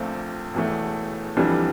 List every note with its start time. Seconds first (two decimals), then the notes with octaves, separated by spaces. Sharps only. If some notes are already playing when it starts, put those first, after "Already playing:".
Already playing: A#1 A#2 A3 C4
0.54 E1 E2 E3 A3
1.37 F1 F2 E3 G3 D4